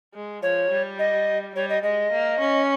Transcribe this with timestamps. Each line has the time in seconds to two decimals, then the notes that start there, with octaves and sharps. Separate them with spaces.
0.15 G#3
0.43 F3 C#5
0.70 G3
0.99 D#5
1.55 G3 C#5
1.69 D#5
1.83 G#3 D#5
2.12 A#3
2.40 C#4